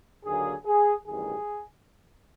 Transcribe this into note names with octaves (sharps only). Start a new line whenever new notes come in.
D#2 D3 F#3 A#3 G#4
G#4
A1 G2 D#3 G#4